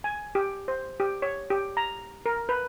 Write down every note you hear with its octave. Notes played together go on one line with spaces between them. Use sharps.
G#5
G4
C5
G4
C#5
G4
A#5
A#4
B4